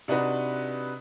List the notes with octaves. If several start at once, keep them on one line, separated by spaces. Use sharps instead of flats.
C3 D4 D#4 F#4 B4